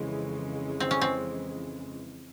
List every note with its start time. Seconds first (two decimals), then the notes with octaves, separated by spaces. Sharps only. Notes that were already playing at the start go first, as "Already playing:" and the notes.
Already playing: F2 C#3 E3 G#3
0.80 C4
0.91 C#4
1.01 C4